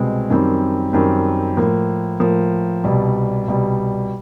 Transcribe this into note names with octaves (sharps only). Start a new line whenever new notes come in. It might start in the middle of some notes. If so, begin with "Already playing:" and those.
Already playing: C2 B2 G#3 C4
F#2 D#3 G3 C4
F#2 D#3 G3 C4
A2 F3 A#3
A2 F3 A#3
C2 B2 G3
C2 B2 G3